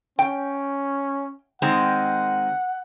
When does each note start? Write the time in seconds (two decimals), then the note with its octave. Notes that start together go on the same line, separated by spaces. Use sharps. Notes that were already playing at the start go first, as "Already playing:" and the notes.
0.19 C#4 G5
1.62 D#3 G#3 C4 F#5